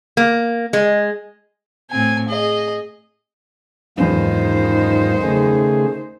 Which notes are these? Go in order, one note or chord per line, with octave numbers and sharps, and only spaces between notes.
A#3
G#3
A2 C4 G#5
G#4 D#5
F#1 E2 G#2 D#3 D#4 F4 C5
C#3 A3 G#4